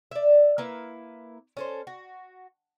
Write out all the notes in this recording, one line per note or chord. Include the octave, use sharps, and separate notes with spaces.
D5 E5
A#3 E4 B4
C#4 A4 C5
F#4